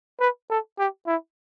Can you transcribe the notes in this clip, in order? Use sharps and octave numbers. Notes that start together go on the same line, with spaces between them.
B4
A4
G4
E4